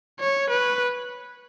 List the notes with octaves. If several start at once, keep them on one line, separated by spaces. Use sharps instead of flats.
C#5
B4